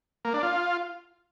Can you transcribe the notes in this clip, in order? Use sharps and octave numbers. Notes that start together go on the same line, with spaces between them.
A#3
D4
F4